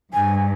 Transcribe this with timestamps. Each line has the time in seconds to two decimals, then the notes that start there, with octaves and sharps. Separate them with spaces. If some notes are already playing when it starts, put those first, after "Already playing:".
0.13 G2 G#5